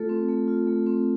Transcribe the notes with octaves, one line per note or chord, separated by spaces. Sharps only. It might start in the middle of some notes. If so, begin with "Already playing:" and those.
Already playing: A3 F4 A4
C4
A3
F4
A3
C4